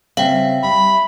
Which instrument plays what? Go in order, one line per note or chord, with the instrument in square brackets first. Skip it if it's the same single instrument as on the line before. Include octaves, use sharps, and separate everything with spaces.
[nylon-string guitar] C#3 G3 C4 [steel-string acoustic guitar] E5 [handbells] F5 G5
[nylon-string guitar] G3 [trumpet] B5